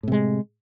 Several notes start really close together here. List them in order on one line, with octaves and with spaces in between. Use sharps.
A2 C3 G#3